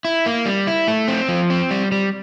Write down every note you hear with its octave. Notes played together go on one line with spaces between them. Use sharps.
E4
A#3
G3
E4
A3
C4
F3
C4
G3
G3